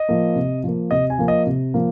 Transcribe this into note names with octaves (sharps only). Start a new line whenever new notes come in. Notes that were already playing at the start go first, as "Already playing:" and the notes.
Already playing: D#5
F3 A#3
C3
F3 A#3
C3 D#5
G#5
F3 A#3
D#5
C3
F3 A#3